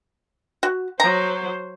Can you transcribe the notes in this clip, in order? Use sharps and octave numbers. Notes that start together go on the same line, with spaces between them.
F#4
F#3 C5 A#5